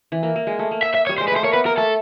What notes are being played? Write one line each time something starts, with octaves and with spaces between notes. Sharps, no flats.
E3
A#3
A#3
G#3
A3
A#3
E5
E5
G3 C#5
G#3 C5
B4
A3 C5
A#3 C#5
B3 B4
A#3 A#4
A3 A4